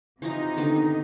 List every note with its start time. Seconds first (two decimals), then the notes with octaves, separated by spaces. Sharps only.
0.22 C3 E3 F3 D#4 A#5
0.57 D3 D#3 B3